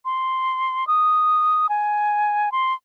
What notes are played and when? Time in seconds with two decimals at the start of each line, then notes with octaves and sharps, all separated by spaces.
0.05 C6
0.87 D#6
1.69 G#5
2.52 C6